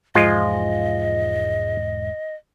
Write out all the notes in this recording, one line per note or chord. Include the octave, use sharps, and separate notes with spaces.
E1 G#2 F3 G#3 F4 D#5